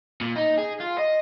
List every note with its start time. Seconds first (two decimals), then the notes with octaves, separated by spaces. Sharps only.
0.21 A#2
0.36 D#4
0.58 G#4
0.80 F4
0.98 D#5